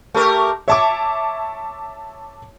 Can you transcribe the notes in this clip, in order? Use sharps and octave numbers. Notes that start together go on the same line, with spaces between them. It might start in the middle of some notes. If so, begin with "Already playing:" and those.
A3 G4 A#4
C#5 E5 A5 D6